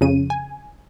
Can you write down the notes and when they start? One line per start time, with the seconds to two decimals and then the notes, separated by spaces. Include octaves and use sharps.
0.01 F2 C#3 D#7
0.30 G#5